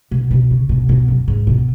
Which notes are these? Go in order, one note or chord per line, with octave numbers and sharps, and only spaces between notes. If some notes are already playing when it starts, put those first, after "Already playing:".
B2
B2
C#3
B2
B2
F#2
G#2
B2